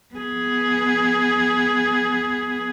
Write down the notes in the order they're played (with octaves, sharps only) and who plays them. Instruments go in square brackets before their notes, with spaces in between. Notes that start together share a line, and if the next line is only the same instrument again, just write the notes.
[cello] B3 G#4